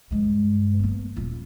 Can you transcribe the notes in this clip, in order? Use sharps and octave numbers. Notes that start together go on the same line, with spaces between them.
G2 G#3
A#3 B3
D#1 F4